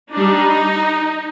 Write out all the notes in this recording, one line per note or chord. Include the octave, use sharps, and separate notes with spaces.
G3 D4 D#4